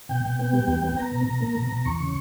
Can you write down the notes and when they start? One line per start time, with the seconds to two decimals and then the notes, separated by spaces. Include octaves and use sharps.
0.09 B2 G5
0.24 B2
0.39 B3
0.53 G3
0.67 E2
0.83 B3
0.97 B3 A#5
1.11 B2
1.27 B2
1.41 A#3
1.56 B2
1.71 B2
1.85 E2 C#6
2.00 C#3